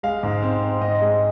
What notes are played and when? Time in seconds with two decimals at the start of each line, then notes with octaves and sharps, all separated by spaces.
0.03 G#3 F5
0.23 G#2
0.43 C4
0.63 C4
0.81 G#2 D#5
1.01 G#3